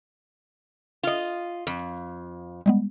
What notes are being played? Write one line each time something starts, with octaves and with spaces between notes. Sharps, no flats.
F4 D#5
F2
G3 G#3 B3